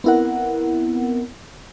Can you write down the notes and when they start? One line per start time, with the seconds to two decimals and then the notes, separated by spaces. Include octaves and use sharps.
0.04 B3 C4 E4 A#4 F#5